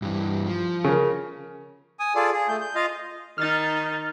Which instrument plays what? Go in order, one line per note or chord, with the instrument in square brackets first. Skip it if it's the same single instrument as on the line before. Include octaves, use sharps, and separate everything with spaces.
[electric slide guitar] G2 E3
F3
[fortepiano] C#3 A#4
[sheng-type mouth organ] G#5 D#6
F4 G#4 A4 D5
G#4
A3 G6
G6
F4 D#5 F5
[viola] D#3 D#4 [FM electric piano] F6 A6